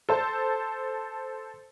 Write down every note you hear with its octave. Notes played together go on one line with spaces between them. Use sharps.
A4 C5 A5